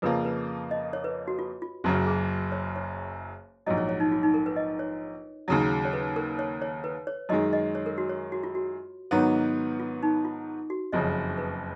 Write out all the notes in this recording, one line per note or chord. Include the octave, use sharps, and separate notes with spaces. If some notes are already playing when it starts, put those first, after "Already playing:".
F2 C#3 F3 A#3 B4
B4
D#5
C#5
B4
F#4
F4
F4
F#1 F#2 C#3 F#4
G#4
C#5
C#5
A#1 G#2 F#3 D#5
C#5
C#5
D#4
F4
D#4
A#4
B4
D#5
C#5
D#2 C#3 F#3
C#5
B4
A#4
C#5
C#5
B4
C#5
F#2 D#3 G#3 D#5
D#5
C#5
A#4
F#4
C#5
F#4
F4
F#4
G#2 D#3 F#3 B3
F4
D#4
F4
F#4
F#1 F2 C#3 D#5
B4